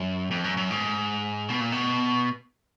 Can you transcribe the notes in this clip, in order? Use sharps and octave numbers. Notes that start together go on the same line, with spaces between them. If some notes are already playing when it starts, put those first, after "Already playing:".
Already playing: F#2
F2
F#2
F#2
G#2
B2
A#2
B2